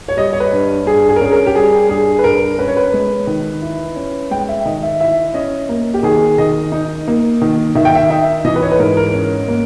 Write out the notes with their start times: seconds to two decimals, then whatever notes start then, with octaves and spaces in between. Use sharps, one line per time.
0.08 C#5
0.17 G3 D#5
0.33 C#5
0.40 B4
0.53 G2
0.86 G2 G#4
1.09 G#4
1.16 A#4
1.21 C#4 G#4
1.32 A#4
1.47 G4
1.55 G3 G#4
1.89 G2 G#4
2.19 B4
2.24 G2 A#4
2.59 C#4 B4
2.68 C#5
2.77 B4
2.94 G#3
3.27 D#3
3.62 E4
3.96 C#4
4.31 G#3 G5
4.49 E5
4.65 D#3 D#5
4.83 E5
5.00 E4 E5
5.34 C#4 D#5
5.69 A#3
5.94 G4
6.03 D#3 G#4
6.38 D#3 D#5
6.72 D#4
7.08 A#3
7.42 D#3
7.75 D#3 E5
7.85 G5
7.95 E5
8.10 D#4 E5
8.45 E3 D#5
8.56 B4
8.62 C#5
8.72 B4
8.79 G#2 A#4
8.97 A#4
9.14 C#4
9.48 A#3